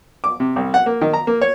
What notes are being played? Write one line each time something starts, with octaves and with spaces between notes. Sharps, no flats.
D6
C3
C2
F#5
A#3
D#3
A#5
A#3
C#5